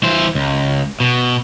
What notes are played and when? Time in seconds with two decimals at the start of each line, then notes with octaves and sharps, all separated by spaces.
0.03 E3 C5
0.35 C#2
1.00 B2